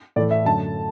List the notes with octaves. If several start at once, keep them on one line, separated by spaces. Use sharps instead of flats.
A2 E3 A3 D5
E5
F#2 D3 A3 A5